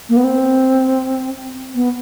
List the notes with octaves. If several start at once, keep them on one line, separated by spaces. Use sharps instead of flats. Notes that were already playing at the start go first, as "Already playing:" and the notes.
A#3
B3
C4
B3